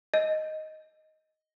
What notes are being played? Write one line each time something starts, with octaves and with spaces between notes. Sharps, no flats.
D#5